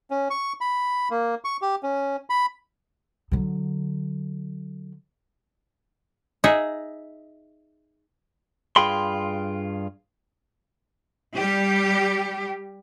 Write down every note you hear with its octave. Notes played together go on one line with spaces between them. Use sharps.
C#4
C#6
B5
A#3
C#6
G4
C#4
B5
D3 F#3
D#4 G#4 E5 F#5
G2 F4 G#4 G5 B5 C6
G3 G4